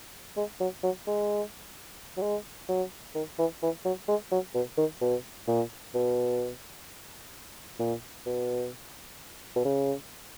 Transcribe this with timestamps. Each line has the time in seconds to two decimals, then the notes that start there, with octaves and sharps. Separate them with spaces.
0.37 G#3
0.61 F#3
0.83 F#3
1.07 G#3
2.17 F#3
2.22 G#3
2.68 F#3
3.15 D#3
3.39 E3
3.62 E3
3.85 F#3
4.08 G#3
4.31 F#3
4.55 B2
4.78 D#3
5.01 B2
5.47 A#2
5.94 B2
7.79 A#2
8.26 B2
9.56 B2
9.65 C#3